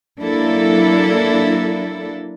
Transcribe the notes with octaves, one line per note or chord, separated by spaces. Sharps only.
F#3 A#3 D4 E4 A4